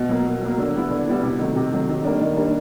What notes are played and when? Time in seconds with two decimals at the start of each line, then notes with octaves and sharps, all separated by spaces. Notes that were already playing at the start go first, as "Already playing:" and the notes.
Already playing: B2
0.09 F#3 A#3
0.26 B2
0.42 F#3 A#3
0.58 D3
0.75 G3 B3 E4
0.91 D3
1.08 G3 B3 E4
1.23 C3
1.39 D#3 F#3 A3
1.56 C3
1.71 D#3 F#3 A3
1.89 D#3
2.04 G3 A#3 D4
2.21 D#3
2.37 G3 A#3 D4